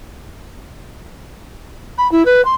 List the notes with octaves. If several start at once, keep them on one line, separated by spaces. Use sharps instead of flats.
B5
E4
B4
C6